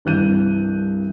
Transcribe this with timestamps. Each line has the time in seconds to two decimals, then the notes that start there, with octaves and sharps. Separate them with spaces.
0.05 C2 G2 E3 F#6 G6 D#7